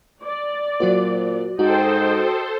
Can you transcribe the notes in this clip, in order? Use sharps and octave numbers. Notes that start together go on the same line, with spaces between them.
D5
A#2 F#3 F#4 C5
G#2 F#4 A4 C5 D#5 G5